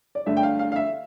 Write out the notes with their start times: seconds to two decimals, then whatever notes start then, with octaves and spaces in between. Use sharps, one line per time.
0.15 D5
0.26 G2 D3 A3 E5
0.37 G5
0.43 F5
0.59 F5
0.72 F5
0.76 E5